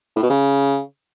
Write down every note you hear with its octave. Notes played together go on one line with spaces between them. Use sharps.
A2
B2
C#3